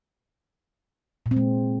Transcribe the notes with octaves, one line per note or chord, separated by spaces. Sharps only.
A#2
C4
G#3